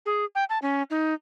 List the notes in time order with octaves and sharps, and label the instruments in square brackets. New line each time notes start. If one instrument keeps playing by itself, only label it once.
[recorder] G#4
G5
A5
C#4
D#4